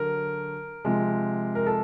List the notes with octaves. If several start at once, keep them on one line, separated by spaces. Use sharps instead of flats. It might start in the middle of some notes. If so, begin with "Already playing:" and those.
Already playing: D3 F#3 A#4
C3 F3 G#3
A#4
A4